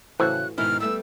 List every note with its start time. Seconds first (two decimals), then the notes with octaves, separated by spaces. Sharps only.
0.20 A2 C#3 E3 F#4 C5 F#6
0.58 G#2 B2 D#3 E4 F6
0.80 G3 A3 B3 E6